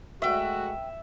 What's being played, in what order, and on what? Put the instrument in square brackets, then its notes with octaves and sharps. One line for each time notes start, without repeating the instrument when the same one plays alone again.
[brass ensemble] G#3 A3 F#4 [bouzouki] B4 G5 [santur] E5